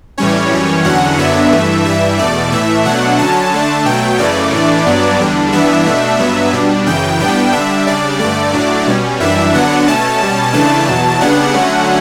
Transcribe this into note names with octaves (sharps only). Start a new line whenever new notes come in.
A2 E3 G3 C#4 C#5
F#2 E3 G3 C#4
E2 D3 F#3 C#4 F#5
F#2 D3 F#3 B3 D4 E5
G2 E3 A3
G2 E3 G3 E5
E2 B2 A3 D5
A2 E3 A3 E5
B2 F#3 A3 D4 F#5
D3 F#3 C#4 A5
D3 A3 D4
B2 F#3 A3 G5
F#2 C#3 E3 A3 D5
A2 E3 A3 D4
G2 F#3 B3 D4
E2 D3 G3 D4
G2 E3 B3 D4 E5
B2 A3 D4
G2 F#3 B3
B2 G3 D4
F#2 C#3 E3 G5
A2 G3 B3 D4 G5
D3 G3 D4 E5
C#3 G3 D4 D5
G2 D3 A3 D5
A2 F#3 A3 D4
B2 G3 C#4
F#2 E3 G3 D4 E5
D3 F#3 B3 D4 F#5
B2 A3 C#4 A5
B2 G3 C#4
C#3 E3 A3 D4 A5
E2 B2 F#3
C#3 G3 B3 D4 F#5
D3 F#3 A3 C#4